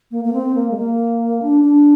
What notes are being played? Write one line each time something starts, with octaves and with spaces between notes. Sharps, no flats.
A#3
A#3
C4
A#3
G#3
A#3
D4
D4